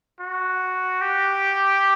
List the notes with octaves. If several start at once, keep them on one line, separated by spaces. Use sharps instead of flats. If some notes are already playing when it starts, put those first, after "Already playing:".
F#4
G4